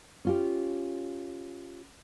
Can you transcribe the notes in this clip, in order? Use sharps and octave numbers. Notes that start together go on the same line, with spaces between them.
C#4 F4 G4